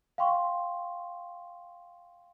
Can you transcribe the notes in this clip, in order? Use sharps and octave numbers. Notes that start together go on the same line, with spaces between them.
F5 G5 C6 C#6